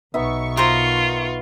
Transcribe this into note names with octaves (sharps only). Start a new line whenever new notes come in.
B1 B3 D#4 E5 C#6
F4 A#4 C5 A#5